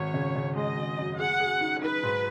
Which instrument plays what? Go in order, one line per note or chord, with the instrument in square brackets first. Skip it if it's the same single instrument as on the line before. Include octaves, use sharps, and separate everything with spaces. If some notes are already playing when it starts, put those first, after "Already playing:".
Already playing: [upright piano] G#1 [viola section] C#5
[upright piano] C#3
C#3
[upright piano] G#3 [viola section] D#5
[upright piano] G#1
F#2
[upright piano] G#4 [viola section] F#5
[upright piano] G#4
D#4
[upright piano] D#4 [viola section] B4
[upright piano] G#2